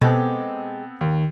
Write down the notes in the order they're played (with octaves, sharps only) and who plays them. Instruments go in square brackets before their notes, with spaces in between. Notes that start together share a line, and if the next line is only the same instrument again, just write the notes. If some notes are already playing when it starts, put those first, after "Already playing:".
[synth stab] B2 [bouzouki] G#3 G4 [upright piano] B3 C4 A4
[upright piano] D#2 [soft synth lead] D#3